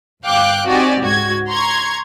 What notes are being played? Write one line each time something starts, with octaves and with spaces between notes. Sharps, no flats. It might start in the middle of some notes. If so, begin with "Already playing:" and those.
G1 F5 G5 D6 F#6
C4 D#4 F#4 G4 D5 G#5
C#2 G#2 F#4 G#6
A#5 C6 C#6 G#6